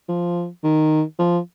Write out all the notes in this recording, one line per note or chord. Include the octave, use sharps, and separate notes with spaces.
F3
D#3
F3